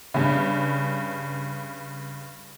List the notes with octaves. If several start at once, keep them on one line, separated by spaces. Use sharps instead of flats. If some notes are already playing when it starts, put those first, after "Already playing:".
G2 C#3